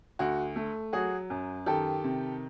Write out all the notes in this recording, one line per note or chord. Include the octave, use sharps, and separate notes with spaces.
D2 F#4
A3
F#3 F#4 G#4
F#2
D#3 G4 A4
C3